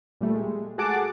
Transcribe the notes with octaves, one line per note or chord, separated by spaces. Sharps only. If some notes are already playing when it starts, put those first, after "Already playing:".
A#2 G3 A3
G#3
F#4 G#4 A4 F#5 A5 D6